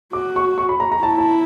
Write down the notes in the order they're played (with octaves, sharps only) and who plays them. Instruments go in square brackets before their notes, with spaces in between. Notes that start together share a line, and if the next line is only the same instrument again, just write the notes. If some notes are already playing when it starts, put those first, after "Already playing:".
[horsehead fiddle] F#4 [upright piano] D6
[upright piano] C#6
C#6
B5
A#5
A#5
[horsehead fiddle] E4 [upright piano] A5
[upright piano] A5